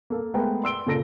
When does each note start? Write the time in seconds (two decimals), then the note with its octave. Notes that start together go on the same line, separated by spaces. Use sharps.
0.10 A#3 A4
0.34 G#3 A3 B3 G#4 A#4 G5
0.64 C6 E6 D7 G7
0.87 A#2 C#3 A4 A#6 D7